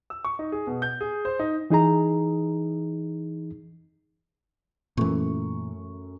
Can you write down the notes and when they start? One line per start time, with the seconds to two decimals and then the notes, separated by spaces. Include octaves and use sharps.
0.10 E6
0.24 C#6
0.39 D#4
0.52 G#4
0.67 B2
0.82 G6
1.01 G#4
1.25 C5
1.39 D#4
1.70 E3 D#4 G#4 A#5
4.97 F#2 A#2 E3 A3 C#6